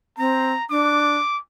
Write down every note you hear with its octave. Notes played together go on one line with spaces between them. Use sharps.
C4 A#5
D4 D6